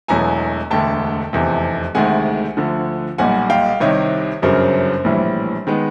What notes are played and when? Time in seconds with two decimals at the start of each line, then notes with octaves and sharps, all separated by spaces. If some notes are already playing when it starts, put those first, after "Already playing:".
0.08 E1 E2 B2 F#3 A3 G#5 A#5
0.71 E1 D2 D3 G5 A5
1.33 F1 E2 C3
1.95 D2 C3 D#3 G#3 F#5 G#5
2.57 D2 D3 F3
3.18 B1 A#2 G3 F#5 G#5
3.50 F5 G5
3.80 C2 C3 D#3 C#5 D#5
4.42 G1 F#2 C#3 F#3 A#4 C5
5.04 A#1 A2 E3 G3
5.67 D#3 G#3 B3